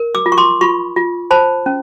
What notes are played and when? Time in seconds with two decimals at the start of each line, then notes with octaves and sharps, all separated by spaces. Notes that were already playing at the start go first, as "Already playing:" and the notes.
Already playing: A#4
0.15 D6 E6
0.26 F4
0.32 C#6
0.38 C6 D6
0.61 F4 B5 C#6
0.96 F4
1.31 C5 A5 B5
1.66 C#4